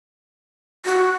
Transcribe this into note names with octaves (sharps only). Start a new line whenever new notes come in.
F#4